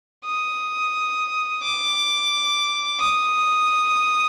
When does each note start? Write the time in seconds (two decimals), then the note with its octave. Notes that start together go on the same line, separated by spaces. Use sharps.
0.25 D#6
1.62 D6
3.00 D#6